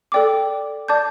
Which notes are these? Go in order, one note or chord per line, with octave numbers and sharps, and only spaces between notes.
A4 D5 G5 D6
D5 A5 D6 G6